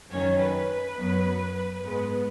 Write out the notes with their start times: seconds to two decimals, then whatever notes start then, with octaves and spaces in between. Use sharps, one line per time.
0.11 F#2 D#3 F#3 C#4 C#5
0.39 B4
0.69 B4
0.97 F#2 F#3 B3
1.83 G#2 G#3 B3 B4